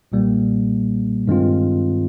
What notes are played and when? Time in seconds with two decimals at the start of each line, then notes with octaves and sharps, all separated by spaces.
0.12 B1 A#2 G3 A#3
1.28 G2 D#3 G#3 C4 F4